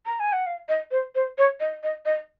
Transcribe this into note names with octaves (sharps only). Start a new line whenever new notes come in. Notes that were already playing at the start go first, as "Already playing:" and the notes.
A#5
G#5
F#5
F5
D#5
C5
C5
C#5
D#5
D#5
D#5